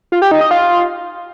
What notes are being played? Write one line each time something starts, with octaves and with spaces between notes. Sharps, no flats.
F4
G4
D#4
D#5
F4